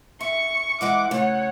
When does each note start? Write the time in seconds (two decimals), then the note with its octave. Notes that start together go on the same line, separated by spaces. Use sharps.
0.21 E5 C#6
0.81 E3 G#3 E4 F#5 D6
1.11 C#3 A3 C#5 F#5